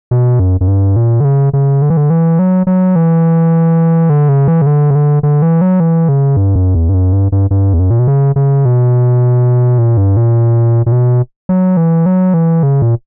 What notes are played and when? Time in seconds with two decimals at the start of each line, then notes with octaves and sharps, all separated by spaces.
0.11 B2
0.40 F#2
0.61 F#2
0.68 G2
0.96 A#2
1.20 D3
1.25 C#3
1.53 C#3
1.82 D3
1.90 E3
1.97 D3
2.10 E3
2.39 F#3
2.67 F#3
2.96 E3
4.10 D3
4.29 C#3
4.48 E3
4.62 C#3
4.67 D3
4.90 C#3
4.95 D3
5.23 D3
5.42 E3
5.61 F#3
5.80 E3
6.09 C#3
6.37 G2
6.55 F#2
6.75 E2
6.89 G2
6.94 F#2
7.13 G2
7.32 G2
7.51 G2
7.74 E2
7.79 F#2
7.91 A#2
7.99 B2
8.07 C#3
8.36 C#3
8.65 B2
9.78 A#2
9.97 G2
10.17 A#2
10.86 A#2
10.92 B2
11.49 F#3
11.77 E3
12.06 F#3
12.34 E3
12.63 C#3
12.82 A#2